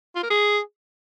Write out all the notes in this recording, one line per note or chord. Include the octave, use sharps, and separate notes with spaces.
F4
A#4
G#4